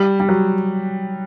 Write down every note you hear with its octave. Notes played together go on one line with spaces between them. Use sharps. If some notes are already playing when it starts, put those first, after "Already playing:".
Already playing: G3
G3
F#3